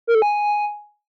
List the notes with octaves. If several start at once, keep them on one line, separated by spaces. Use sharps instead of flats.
A#4
A4
G#5